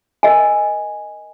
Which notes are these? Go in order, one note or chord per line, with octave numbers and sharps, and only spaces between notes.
A#4 D#5 G#5